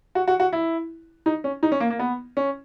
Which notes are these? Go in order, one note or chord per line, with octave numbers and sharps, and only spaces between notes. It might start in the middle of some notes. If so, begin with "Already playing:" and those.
F#4
F#4
F#4
E4
D#4
C#4
D#4
C#4
A#3
A#3
B3
C#4